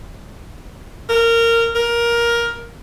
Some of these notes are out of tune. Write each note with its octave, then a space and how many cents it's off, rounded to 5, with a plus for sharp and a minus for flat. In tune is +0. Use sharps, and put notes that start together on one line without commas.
A#4 -15
A#4 +15